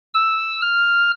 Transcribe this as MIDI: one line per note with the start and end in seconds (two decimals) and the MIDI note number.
0.14 0.61 88
0.62 1.11 89